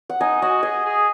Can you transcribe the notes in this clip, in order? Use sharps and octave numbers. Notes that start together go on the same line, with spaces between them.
F#5
D#4 D#5 G#5
F#4 D#5 G#5
G#4 D#5 G#5
G#4